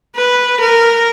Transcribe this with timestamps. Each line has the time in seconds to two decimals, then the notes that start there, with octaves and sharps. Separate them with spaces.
0.16 B4
0.60 A#4